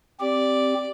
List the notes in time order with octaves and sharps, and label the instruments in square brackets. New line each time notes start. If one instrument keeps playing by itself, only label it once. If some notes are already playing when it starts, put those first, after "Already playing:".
[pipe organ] C4 G4 [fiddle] D5